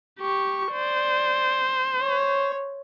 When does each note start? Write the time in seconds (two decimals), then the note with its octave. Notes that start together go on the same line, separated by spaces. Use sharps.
0.19 G4 C#6
0.72 C5 D5
2.01 C#5